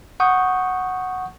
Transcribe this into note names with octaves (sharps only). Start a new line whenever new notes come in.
F#5 C#6 D#6 G6